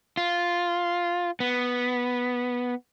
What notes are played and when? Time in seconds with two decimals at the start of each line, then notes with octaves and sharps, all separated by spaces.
0.17 F4
1.40 B3